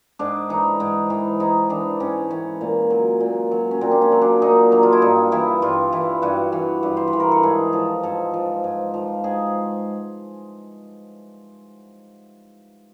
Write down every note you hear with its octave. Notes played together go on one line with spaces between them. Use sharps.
G#2 D4
E3 D#4
G#2
E3
G#2 D#4
E3 D4
G#2 C#4
E3 C#4
A#2
F#3
A#2
F#3
C#4
A#2 C4
D4
C#4
F#3
D4
A#2 D#4
F#3 D4
F4
E4
G2 D#4
E3 E4
G2 F4
E3 E4
G2 F#4
E3
G2
C5
B4
E3
A#4
A4
G#2 G#4
F3 A4
G#2 A4
F3
G#2
F3
G#2 G#4